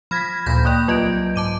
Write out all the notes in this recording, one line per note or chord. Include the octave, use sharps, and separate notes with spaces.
F3 B5 F6 G#6 A#6 B6
D2 A#2 B5 G6 A#6
A#3 D5 G5 D#6 F#6
C2 F#3 F4 D#5 G6 D7
G#2 A5 D6 D#7